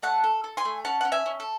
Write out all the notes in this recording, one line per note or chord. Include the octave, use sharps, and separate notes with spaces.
A3 F#5 A5
A4
A4
G#5 C6
A3
C#4 F#5 A5
C#4 F#5
E5 G#5
C#4
A4